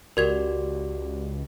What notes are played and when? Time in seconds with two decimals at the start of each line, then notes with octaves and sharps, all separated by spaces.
0.17 C#2 F#4 G4 A#4 D5 G#6 F7